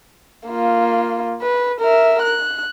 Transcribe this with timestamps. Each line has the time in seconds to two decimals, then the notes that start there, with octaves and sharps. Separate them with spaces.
0.48 A#3 F4
1.41 B4
1.81 A#4 E5
2.22 F#6